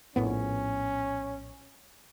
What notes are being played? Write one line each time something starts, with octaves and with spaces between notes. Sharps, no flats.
A#1 A2 B3 C#4